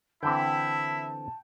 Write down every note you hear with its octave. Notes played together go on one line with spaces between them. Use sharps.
D3 E3 C4 E4 E5 G5 A5